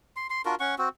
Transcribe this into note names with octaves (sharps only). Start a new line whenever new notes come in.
C6
C6
D4 F4 F#4 A#4
C#4 F#5 C#6
C4 F#4